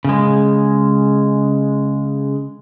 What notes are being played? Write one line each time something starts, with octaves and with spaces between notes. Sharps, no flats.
C#3 G#3